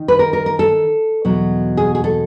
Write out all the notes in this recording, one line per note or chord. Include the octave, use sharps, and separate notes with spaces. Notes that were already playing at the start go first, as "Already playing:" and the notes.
Already playing: D#3
B4
A#4
A#4
A#4
A4
E2 B2 F#3
G#4
G#4
A4